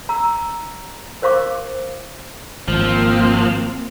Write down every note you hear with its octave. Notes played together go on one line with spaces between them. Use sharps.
A#5 E6
A#4 C5 F5 C#6 D6
G#1 F3 A#3 C4